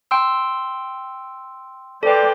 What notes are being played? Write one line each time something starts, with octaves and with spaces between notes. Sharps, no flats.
G5 C6 E6
A4 B4 C5 D5 G5